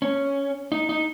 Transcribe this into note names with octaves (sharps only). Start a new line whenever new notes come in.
C#4
D#4
D#4